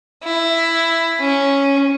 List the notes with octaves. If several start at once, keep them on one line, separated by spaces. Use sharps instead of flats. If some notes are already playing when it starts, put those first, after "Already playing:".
E4
C#4